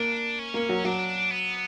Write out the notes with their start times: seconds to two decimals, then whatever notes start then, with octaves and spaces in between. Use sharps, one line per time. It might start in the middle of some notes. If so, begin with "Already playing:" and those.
Already playing: A#3 D4
0.39 C#4
0.54 A#3
0.69 F#3
0.84 F#3 D4
1.31 B3